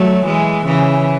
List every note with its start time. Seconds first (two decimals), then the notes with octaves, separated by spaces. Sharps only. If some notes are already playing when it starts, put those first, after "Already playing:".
Already playing: F#3 A3
0.25 E3 G#3
0.65 C#3 E3